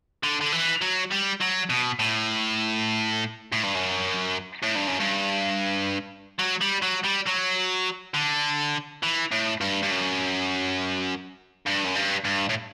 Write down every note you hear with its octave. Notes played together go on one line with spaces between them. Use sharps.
D3
D3
E3
F#3
G3
F#3
B2
A2
A2
G2
F#2
A2
G2
F#2
G2
F#3
G3
F#3
G3
F#3
D3
E3
A2
G2
G2
F#2
G2
F#2
G2
G2
A2